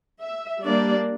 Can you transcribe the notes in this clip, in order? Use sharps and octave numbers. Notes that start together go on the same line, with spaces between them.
E5
G3 A#3 D4 D5